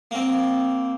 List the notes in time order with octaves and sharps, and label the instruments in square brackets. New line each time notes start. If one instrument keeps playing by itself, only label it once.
[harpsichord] A#3 C4